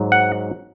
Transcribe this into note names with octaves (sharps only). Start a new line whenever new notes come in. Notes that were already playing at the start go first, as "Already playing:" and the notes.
Already playing: G#2 F#3
F#5